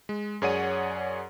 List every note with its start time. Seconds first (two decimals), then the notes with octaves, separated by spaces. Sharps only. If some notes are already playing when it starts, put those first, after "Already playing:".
0.09 G#3
0.42 F#2 G#4 C#5 D5 F#5 D#7